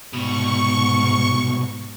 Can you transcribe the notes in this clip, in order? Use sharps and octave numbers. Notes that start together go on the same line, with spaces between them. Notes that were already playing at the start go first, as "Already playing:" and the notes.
C2 G#2 B2 C#6